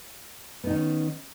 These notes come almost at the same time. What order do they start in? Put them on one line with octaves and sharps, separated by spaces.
B3 D#4 D#3 C#4